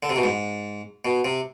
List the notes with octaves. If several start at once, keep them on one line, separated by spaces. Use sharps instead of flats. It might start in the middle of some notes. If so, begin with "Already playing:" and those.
D3
C3
B2
G#2
B2
C3